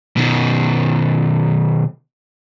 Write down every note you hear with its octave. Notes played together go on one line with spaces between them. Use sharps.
B2 D#3